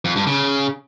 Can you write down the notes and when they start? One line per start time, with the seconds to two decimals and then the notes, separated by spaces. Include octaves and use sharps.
0.05 F2
0.16 G2
0.27 C#3